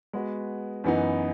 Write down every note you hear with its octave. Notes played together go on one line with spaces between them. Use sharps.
G#3 B3 F#4 B4
F#2 E3 B3 D#4